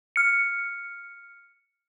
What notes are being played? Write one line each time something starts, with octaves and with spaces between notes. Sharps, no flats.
F6 C#7